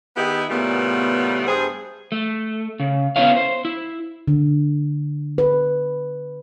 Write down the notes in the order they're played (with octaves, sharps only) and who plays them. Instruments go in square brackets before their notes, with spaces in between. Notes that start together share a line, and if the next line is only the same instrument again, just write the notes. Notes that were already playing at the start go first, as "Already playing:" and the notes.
[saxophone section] D#3 B3 D#4 E4 G4 G#4
E2 A#2 C#3 G3 A3 B3
G2 G#4 C5
[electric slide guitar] A3
C#3
B3 C#4 E4 A4 C#5 F5
C5
E4
[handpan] D3
B4